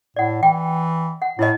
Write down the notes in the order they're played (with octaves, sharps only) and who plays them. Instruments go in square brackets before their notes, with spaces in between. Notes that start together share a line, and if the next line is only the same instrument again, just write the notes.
[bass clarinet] A2 [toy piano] D5 F#5
[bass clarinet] E3 [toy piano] G5
[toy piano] F#5
[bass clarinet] A2 [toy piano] E4 D#5